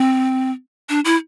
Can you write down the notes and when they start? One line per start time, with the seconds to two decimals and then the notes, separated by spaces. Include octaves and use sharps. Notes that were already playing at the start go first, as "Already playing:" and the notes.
Already playing: C4
0.89 D4
1.05 E4